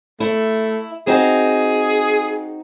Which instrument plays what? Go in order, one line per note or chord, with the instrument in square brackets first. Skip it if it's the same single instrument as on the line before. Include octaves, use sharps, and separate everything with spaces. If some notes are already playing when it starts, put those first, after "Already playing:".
[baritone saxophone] A3 [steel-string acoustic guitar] E4
[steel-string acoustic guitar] C4 D#4 F#4 [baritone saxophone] G#4